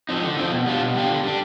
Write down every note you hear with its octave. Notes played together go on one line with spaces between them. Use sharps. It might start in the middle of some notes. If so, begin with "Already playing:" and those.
F3 C4 D#4
D3
F3 C4 D#4
B2
G3 D4 F4
B2
G3 D4 F4
D3
G3 D4